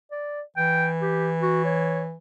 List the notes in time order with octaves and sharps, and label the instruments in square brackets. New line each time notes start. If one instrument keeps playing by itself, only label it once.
[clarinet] D5
[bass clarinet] E3 [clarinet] G5
[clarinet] G4
F#4
C#5